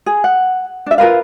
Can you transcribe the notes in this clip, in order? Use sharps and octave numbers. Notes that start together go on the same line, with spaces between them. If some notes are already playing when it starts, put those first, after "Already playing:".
G#4
F#5
D4 E5
F4 A#4 B4 F5